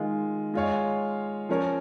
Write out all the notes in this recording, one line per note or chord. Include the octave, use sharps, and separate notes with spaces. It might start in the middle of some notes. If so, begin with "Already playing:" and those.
Already playing: D#3 G#3 F4
G#3 F4 C#5 F5
F3 C#4 A#4 C#5